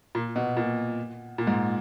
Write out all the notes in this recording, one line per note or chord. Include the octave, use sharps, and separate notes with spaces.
A#2
B2
A#2
A#2
G#2